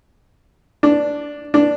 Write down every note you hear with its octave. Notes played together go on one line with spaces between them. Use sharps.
D4
D4